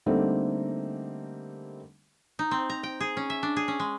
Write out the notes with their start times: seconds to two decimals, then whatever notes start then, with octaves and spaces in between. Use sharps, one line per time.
0.06 D3 G3 A3 A#3 C4 D#4
2.39 D#4
2.51 C4
2.70 A#5
2.83 G5
3.00 G#4
3.17 C#4
3.30 E5
3.43 D4
3.56 G#4
3.68 C#4
3.80 G#3